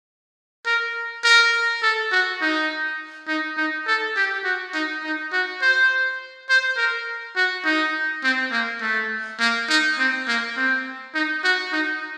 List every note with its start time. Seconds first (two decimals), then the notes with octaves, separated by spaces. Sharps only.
0.66 A#4
1.24 A#4
1.83 A4
2.12 F#4
2.41 D#4
3.28 D#4
3.57 D#4
3.87 A4
4.16 G4
4.44 F#4
4.74 D#4
5.04 D#4
5.32 F#4
5.62 C5
6.49 C5
6.77 A#4
7.36 F#4
7.65 D#4
8.24 C4
8.52 A#3
8.82 A3
9.40 A#3
9.69 D#4
9.98 C4
10.28 A#3
10.57 C4
11.15 D#4
11.44 F#4
11.73 D#4